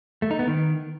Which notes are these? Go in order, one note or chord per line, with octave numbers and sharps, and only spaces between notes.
A3
D#4
B3
D#3